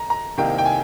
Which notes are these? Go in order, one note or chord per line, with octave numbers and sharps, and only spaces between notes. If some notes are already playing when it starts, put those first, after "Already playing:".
Already playing: A#5
A#5
C2 C3 D#3 A#3 D#4 G5
G5
G#5